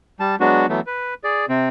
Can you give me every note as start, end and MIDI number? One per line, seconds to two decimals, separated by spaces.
0.20 0.36 55
0.20 0.36 81
0.40 0.66 54
0.40 0.66 56
0.40 0.66 59
0.40 0.66 62
0.40 0.66 66
0.69 0.80 52
0.69 0.80 54
0.69 0.80 57
0.69 0.80 59
0.87 1.14 71
1.24 1.45 68
1.24 1.45 74
1.49 1.69 48
1.49 1.69 60